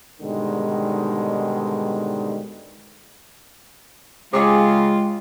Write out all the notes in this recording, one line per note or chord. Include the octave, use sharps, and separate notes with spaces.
G#2 B2 D3 D#3 G3 G#3
C#3 G#3 F4 G4 G#4 C#5